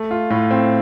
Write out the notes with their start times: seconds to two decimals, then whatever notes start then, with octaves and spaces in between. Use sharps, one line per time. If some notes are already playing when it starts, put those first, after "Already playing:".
Already playing: A3
0.11 F4
0.30 A2
0.51 C4